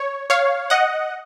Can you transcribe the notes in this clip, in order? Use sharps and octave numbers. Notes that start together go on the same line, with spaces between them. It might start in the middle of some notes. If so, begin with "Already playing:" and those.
Already playing: C#5
C#5 F5
D#5 F#5